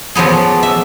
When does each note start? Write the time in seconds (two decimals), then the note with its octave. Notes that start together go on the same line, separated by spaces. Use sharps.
0.15 F3 F#3 B3 G#4
0.43 D5
0.63 E5